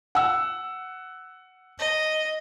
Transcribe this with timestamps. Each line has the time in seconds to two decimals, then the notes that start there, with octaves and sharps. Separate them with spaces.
0.15 F#5 E6
1.79 D#5